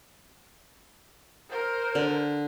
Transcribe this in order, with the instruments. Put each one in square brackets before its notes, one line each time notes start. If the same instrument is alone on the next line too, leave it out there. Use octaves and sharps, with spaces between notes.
[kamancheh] A#4 C5
[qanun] D3